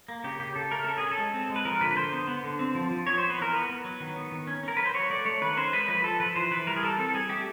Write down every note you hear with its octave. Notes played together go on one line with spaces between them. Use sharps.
A#3
C#3 G4
C#3 G4
C#3 A4
A3 A#4
C#4 A4
C#4 G#4
A4
G#3
C4
G#3
B4
F3 A#4
D3 B4
B4
D3 C5
B3
B3
D3
C4
F3
F3
B3 C#5
B3 C5
B4
E3 A#4
B3 B4
B3
F#3
D#3
B3
D#3
C#4
C#4 A#4
F#3 B4
C5
F#3 C#5
A3 D5
A3 C#5
D#3 B4
C#4 C5
G#3 B4
F3 B4
F3 A4
F3 B4
E3 C5
E3 B4
G3 A#4
G#4
E3 A4
C4 A4
G3 G#4
A3 G4